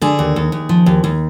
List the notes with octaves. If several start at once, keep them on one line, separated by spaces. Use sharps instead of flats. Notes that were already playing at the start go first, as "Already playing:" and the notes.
D3 G#4
D#2
D#2
D#2
F3
D#2
D#2